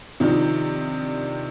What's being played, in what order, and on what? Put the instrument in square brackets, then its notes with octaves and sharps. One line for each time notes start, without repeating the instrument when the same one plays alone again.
[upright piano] C3 D#3 F3 D4 D#4